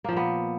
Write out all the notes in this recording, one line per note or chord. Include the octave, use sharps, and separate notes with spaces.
A#2 F3 A#3 B3